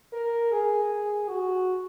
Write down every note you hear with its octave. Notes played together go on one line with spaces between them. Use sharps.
A#4
G#4
F#4